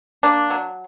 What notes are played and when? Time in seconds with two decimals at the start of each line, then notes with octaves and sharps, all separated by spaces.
0.23 A#3 D4
0.50 F#3